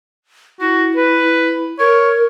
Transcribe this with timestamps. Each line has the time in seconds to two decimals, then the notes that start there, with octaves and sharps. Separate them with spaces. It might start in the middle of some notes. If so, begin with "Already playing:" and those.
0.60 E4 F#4
0.96 B4
1.80 A#4 C#5